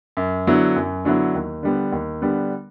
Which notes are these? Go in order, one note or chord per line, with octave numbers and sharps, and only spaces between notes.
F#2
D3 F#3 B3 E4
F#2
D3 F#3 B3 E4
D#2
D3 G3 B3
D#2
D3 G3 B3